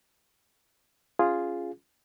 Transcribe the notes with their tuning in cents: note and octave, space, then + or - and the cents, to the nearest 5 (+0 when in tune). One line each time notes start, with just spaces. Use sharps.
C#4 +0 F4 +0 G#4 +0